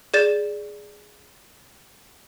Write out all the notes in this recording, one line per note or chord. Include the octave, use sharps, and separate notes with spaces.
G#4 D5 A6 E7